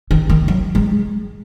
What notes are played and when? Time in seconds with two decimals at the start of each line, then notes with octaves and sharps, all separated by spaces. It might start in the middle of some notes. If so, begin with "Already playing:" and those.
0.11 D#3
0.29 D#3
0.48 F#3
0.75 G#3